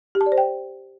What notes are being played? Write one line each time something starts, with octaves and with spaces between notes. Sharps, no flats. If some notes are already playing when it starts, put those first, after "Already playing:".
G4
A5
D5
C5
G5